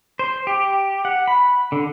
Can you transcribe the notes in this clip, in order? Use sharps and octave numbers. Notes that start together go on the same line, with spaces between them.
C5
G4
F#5
B5
D3